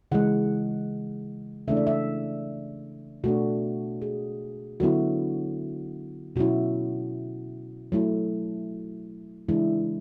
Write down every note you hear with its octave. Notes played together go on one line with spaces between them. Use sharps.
C#3 E3 G#3 F#5
C#3 E3 A3 D4 E5
D5
E5
B2 A3 D4 F#4
G#4
D3 F#3 B3 E4 F#4
B2 F#3 C#4 E4 F#4
F#3 A3 E4
C#3 E3 G#3 D4 E4